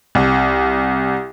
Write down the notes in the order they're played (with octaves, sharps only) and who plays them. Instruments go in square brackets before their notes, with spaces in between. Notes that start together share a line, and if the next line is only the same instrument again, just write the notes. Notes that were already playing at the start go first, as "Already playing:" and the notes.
[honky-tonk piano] C2